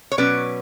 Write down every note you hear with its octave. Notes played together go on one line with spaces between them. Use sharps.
C#5
B2 F#3 C#4 B4 D5